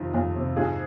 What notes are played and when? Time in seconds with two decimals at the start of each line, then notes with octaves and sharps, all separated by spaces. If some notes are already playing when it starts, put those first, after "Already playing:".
Already playing: F2 C3 D#3 F4
0.13 F2 F4
0.36 C3
0.56 G#2 F4 G#4